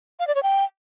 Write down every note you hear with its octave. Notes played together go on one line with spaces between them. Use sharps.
F5
D5
C#5
G5